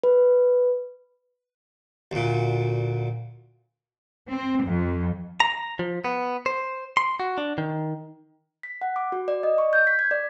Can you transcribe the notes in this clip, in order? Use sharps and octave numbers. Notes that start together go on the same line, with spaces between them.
B4
D2 A#2
C4
F2
A#5
F3
B3
C5
C6
F#4
D4
D#3
B6
F#5
D6
F#4
D5
D#5
C#6
G6
B6
G#6
D5